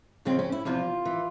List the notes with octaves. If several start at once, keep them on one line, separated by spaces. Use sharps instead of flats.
F2 C#3 F3 C4
C#4
E4
E2 C3 F3 F4
E3